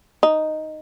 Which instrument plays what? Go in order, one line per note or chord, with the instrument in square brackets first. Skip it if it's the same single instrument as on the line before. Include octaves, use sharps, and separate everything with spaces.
[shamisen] D#4